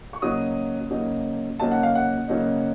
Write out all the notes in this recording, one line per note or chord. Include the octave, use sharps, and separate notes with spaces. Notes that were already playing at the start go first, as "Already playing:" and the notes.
C#6
C#3 F#3 A#3 D#4 D#6
C#3 F#3 A#3 D#4
C#3 F#3 A#3 D#4 A5
F#5
F5
F#5
C#3 F#3 A#3 D#4